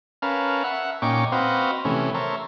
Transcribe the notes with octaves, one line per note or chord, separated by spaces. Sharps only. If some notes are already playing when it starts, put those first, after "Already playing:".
C#4 A#4 B4 F5 A5
E5 F#5
A#2 C#4 D#4 G5 C#6 D6
C4 F#4 B4 C5 D#5 F5
C3 E3 A3 C#4
A#4 C5 C#5 E5 A5